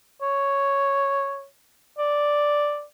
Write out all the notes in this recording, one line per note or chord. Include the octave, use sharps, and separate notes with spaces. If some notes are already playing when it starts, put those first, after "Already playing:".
C#5
D5